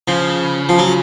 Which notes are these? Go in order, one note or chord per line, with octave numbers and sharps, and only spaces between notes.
C#3 F3
F3
F#3